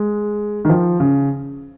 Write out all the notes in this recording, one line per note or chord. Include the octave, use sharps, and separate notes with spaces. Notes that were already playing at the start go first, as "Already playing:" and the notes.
Already playing: G#3
D#3
F3
C#3